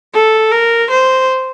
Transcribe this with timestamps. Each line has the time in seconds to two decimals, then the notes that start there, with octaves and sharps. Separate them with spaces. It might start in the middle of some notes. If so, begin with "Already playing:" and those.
0.14 A4
0.52 A#4
0.90 C5